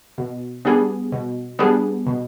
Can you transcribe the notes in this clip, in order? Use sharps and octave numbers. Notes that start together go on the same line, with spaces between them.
B2
G3 B3 D4 G#4
B2
G3 B3 D4 G#4
B2